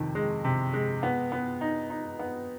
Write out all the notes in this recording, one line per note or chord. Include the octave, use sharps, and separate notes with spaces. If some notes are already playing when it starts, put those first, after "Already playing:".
Already playing: F2 C3 D#3
G#3
C3
G#3
B3
B3
D#4
D#4
B3